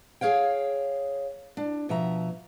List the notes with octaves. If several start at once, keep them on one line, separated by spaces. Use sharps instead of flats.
G#4 C#5 F5 G5
D4
B2 F3 E5 A#5